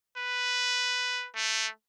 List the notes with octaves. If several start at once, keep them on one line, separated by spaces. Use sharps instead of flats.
B4
A3